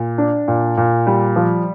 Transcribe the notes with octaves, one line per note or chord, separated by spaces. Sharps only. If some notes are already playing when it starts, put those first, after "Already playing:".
Already playing: A#2
D4
A#2
A#2
G3
F3